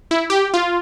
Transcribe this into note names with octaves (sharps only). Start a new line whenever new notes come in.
E4
G4
F4